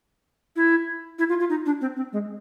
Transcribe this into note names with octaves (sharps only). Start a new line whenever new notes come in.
E4
E4
F4
F4
D#4
D4
C4
C4
G#3